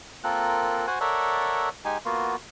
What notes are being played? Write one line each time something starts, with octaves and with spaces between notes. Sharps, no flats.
A#3 C4 F4 A4 A#4 F#6
F#4 C5 F#5 G#5 F#6
A4 A#4 C#5 D5 E5 F#5
G#3 D#4 G4 G#5
A#3 B3 F4 F#4